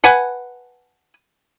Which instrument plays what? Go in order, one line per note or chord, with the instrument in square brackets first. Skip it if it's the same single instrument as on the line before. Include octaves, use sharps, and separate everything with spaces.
[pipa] B4 F#5 G#5